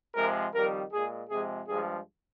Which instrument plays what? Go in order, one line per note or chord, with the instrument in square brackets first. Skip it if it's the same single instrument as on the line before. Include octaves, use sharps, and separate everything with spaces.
[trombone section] C3 F3 G#3 A#4
F2 D#3 G3 A#4
A#2 G#3 G#4
C3 F3 G#3 G#4
G2 F3 G#3 G#4